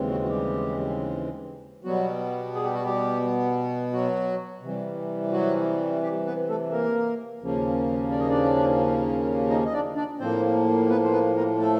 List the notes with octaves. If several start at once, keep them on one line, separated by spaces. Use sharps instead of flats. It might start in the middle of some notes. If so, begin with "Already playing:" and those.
Already playing: D#2 C#3 E3 G#3 C4
F#3 F#4
F#4
G3 G4
B2 F#3 G3 B3 F#4
G#4
G4
F#4
G3 G4
F#3 F#4
C3 E3 G3
F#3 F#4
G3 G4
B3 B4
A3 A4
A#3 A#4
D#2 C#3 F3 A#3 C#4
D5
D#5
D4 D5
D#4 D#5
D#5
D4 D5
D4 D5
A2 F3 A#3 C4 C5
B3 B4
C5
B3 B4
A#3 A#4
A3 A4